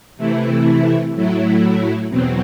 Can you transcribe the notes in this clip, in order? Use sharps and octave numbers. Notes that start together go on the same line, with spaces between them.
C3 E3 A3 E4
A2 F#3 A3 E4
E2 B2 F#3 C4